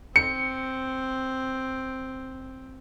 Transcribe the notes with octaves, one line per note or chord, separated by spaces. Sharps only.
C4 C#7